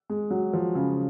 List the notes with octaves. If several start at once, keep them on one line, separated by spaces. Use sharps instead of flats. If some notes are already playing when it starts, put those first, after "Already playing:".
G#3
F#3
F3
C#3